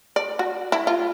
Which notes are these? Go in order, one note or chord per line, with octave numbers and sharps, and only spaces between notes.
D5
F#4
E4
F4